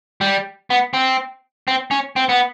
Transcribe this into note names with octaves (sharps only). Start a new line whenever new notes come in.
G3
B3
C4
C4
C#4
C4
B3